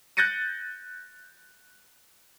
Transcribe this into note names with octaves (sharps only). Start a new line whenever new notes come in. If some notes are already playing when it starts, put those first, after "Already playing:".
F#6 G6 A6 A#6 C#7 D#7